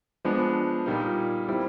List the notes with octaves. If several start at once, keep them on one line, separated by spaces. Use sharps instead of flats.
F3 G#3 B3 D4
A#2 G3 A#3 D#4
G3 C4 E4